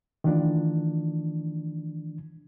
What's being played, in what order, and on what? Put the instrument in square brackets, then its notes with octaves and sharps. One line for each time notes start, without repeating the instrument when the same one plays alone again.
[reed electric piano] D#3 E3 A3 D4 F4